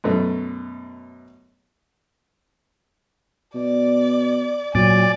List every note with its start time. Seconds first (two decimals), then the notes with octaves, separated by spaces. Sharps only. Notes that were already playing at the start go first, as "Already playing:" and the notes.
0.04 F#2 B2 A3
3.54 B2 D5
4.75 A#2 F#3 D5 G#5